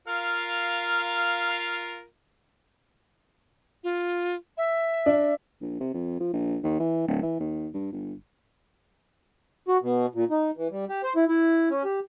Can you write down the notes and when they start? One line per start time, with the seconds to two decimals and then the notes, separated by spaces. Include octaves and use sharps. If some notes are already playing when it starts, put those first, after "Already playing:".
0.08 F4 A#4 F5
3.84 F4
4.57 E5
5.06 D4
5.61 A#1
5.80 C3
5.94 F2
6.20 F3
6.33 A#1
6.63 D#2
6.79 E3
7.07 D1
7.22 E3
7.40 D#2
7.74 G2
7.92 G1
9.68 F#4
9.82 B2
10.15 A#2
10.31 D#4
10.57 E3
10.71 G3
10.89 G4
11.03 C5
11.16 E4
11.29 E4
11.70 C#4
11.85 G4